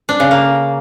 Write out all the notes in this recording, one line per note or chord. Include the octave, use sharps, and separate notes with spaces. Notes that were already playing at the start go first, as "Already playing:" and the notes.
D4
C#3
A#3